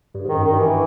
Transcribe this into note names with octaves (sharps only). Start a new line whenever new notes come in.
G2
G#2
D#3
F#2
G2 D#3
E3